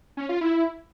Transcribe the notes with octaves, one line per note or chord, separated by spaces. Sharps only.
C#4
F4
E4